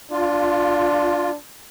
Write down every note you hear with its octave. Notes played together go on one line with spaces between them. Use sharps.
D4 F4